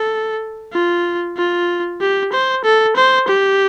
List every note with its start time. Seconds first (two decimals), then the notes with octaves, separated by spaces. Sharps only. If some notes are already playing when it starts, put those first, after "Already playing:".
Already playing: A4
0.73 F4
1.37 F4
2.01 G4
2.32 C5
2.64 A4
2.96 C5
3.28 G4